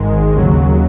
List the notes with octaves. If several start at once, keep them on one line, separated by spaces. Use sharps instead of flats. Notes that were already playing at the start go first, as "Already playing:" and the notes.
Already playing: G#1 G#2 D#3 G#3
D#2 C#3 F#3